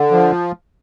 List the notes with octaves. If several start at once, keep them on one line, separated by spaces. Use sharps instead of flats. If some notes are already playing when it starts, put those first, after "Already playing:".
Already playing: D3
F3